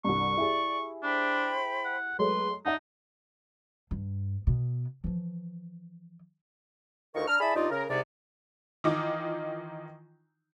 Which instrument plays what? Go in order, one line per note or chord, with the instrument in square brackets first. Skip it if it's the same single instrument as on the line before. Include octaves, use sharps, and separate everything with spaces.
[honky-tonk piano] C2 G2 [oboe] C#6
[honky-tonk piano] E4 G4 G#4 [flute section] D5
[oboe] D4 [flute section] C5 G5 B5
[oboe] F#5
[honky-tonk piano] F#3 G#3 A3 [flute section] B4 [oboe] C6
[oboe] D#4 [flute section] D5 [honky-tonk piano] E5 F#5 A5
[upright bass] G2
B2 B3
E3 F3
[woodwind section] D2 D#3 D#4 F4 A#4 C#6
D4 A#5 F6
E4 G#4 D5 E5 A5 B5
G2 D#4 F4 D5
C#3 A#4
C2 G#2 C3 D5
[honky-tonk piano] D#3 E3 D#4 F4 D6